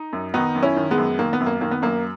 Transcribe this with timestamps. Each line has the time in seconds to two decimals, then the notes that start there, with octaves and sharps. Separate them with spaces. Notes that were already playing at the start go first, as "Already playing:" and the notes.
Already playing: D#4
0.13 F#2
0.34 D#3 B3 D#4
0.55 F#2
0.63 C#4 E4
0.76 D#3
0.91 G#3 B3
0.98 F#2
1.19 D#3 A#3
1.33 B3
1.40 F#2
1.46 A#3
1.61 D#3 A#3
1.71 B3
1.82 F#2 A#3